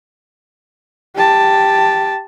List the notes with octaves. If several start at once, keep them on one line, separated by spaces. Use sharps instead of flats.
G4 A5